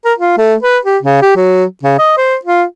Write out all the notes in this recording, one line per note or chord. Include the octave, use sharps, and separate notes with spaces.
A#4
F4
A3
B4
G4
C#3
G4
F#3
C#3
D#5
C5
F4